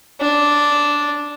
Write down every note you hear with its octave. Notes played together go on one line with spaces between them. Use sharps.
D4